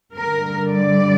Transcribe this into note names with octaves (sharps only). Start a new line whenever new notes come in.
G2 D3 G3 A#4
D5